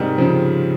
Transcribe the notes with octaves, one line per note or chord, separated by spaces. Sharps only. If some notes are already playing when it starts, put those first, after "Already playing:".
Already playing: G#2 C3 D#3 G3
C#3 F3